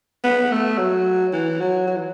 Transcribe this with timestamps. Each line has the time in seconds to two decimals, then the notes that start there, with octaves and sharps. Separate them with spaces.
0.24 B3
0.52 A3
0.78 F#3
1.33 E3
1.60 F#3
1.87 F#3
1.96 E3